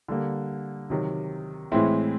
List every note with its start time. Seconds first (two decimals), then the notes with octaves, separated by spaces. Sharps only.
0.08 D3 G3 A#3
0.90 C3 D#3 F#3
1.72 A2 E3 G#3 C4 E4